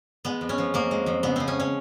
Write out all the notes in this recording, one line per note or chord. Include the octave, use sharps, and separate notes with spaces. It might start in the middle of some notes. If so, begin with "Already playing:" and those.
G#3 B3
F2
C#4
F3
F2 A#3
G#3
F2
C#3 B3
F3 C4
C#4
C#4